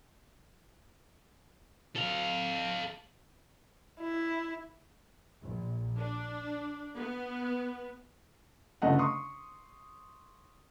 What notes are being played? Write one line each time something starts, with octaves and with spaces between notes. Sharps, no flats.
A4 F5
E4
A#1
D4
B3
G1 C#3 A3 D#5 F#5
C6 C#6 D#6